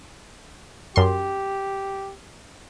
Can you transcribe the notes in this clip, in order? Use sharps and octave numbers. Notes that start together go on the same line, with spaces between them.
F#2 G4 C6